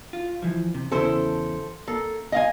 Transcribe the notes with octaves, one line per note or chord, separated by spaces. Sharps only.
F4
E3 F3
C3
E2 C#3 E4 A4 C5
A#3 A4
D#5 F5 G#5